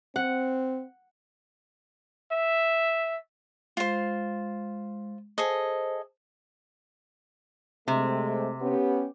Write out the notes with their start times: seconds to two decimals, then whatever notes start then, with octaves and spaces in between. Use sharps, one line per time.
0.16 C4 F#5
2.32 E5
3.77 G#3 F4 C5
5.38 G#4 A4 C5 D#5
7.88 C3 G#3 A3 C4
8.61 B3 C#4 G4